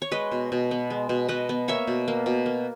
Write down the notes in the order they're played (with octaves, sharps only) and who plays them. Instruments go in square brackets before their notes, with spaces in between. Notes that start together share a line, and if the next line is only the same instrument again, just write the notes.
[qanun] C#5
G#3 B4 D#5
B2
B2
B3
G#3
B2
B2 B4 D#5
B3
A#3 C#5 E5
B2
A#3
B2
A#3